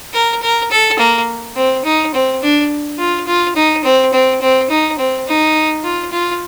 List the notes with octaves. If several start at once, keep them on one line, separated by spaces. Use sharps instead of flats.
A#4
A#4
A4
A#3
C4
D#4
C4
D4
F4
F4
D#4
C4
C4
C4
D#4
C4
D#4
F4
F4